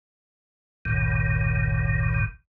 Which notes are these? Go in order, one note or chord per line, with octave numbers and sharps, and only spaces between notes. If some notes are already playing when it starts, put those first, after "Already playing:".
F#1 C#2 G2 A#2 D#3